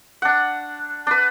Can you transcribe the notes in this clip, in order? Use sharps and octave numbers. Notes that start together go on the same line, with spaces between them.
D4 F#5
D4 B4